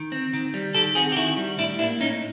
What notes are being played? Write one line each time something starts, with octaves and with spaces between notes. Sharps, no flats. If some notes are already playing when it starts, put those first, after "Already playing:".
Already playing: D#3
C4
D#3
G3
D#3 G4 A4
C4 F#4 G#4
G4
D#3 E4 F#4
G3
A2 D4 E4
A#3 D4 E4
A2 C#4 D#4